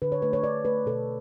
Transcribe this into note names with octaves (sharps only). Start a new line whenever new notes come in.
D3 B4
C#5
A3 B4
C#5
D3 D5
A3 B4
B2 A4